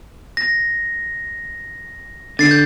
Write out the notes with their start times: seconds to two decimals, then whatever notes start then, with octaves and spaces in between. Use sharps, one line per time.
0.37 A#6
2.39 D3 A6 C7
2.51 G6